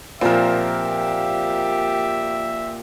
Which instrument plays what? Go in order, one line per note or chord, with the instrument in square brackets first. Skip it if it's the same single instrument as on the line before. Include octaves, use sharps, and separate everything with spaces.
[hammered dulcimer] A#2 A#4 [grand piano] F3 C4 [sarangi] G4 [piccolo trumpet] E5